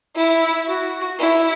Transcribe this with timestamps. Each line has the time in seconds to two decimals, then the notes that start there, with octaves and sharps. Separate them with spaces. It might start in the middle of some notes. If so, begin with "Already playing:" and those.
0.16 E4
0.68 F#4
1.19 E4